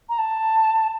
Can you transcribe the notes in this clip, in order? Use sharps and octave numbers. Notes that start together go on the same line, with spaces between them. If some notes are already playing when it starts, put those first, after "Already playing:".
A#5
A5